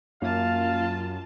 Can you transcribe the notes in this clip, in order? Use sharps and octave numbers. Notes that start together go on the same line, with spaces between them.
F#2 A#3 F4 F5 A5